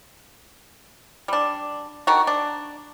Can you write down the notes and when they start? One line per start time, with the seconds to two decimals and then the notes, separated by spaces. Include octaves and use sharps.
1.28 G3 D4
2.07 D3 D#3 F#4
2.27 D4